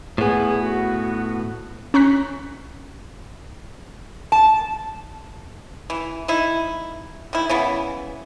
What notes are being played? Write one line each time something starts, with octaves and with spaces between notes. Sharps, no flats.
A2 B3 G#4
F#4
C#4 A#5 C#6 F#6 B6
A5
E3
D#4 E4
D#3 E4
C#3 E3 B3